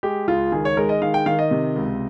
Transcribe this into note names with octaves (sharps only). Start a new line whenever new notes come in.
G#3 G4
C#2 F4
D#3 G#4
C#5
G#3 A#4
D#5
D#3 F5
G5
D#3 F5
D#5
C3
C#2